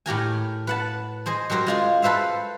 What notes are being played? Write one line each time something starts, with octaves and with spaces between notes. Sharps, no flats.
A2 G4 A#4 G#5
B4 F#5 A5
G#4 C5 D#5 G#5
F#3 G4 A#4 C5
G#3 F4 G#4
A4 B4 C5 E5 F5